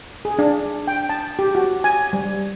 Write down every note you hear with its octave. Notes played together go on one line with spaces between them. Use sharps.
G#4
D4
G5
A5
G4
F#4
G#5
G3